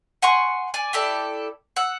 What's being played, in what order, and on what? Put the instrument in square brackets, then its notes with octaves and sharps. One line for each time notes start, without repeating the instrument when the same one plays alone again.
[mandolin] F#5 G#5 C6 C#6
D5 G#5 D6
E4 G4 A4 D5
F#5 E6